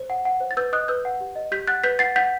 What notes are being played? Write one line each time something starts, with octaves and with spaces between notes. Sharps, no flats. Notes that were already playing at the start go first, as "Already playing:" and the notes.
Already playing: C5
F#5
F#5
C5
A6
B4 E6 G6
D#5 D#6 F#6
B4 E6 G6
F#5
G4
D#5
G4 G6 B6
F#5 F#6 A6
B4 G6 B6
F#5 A6 C7
F#5 G6 B6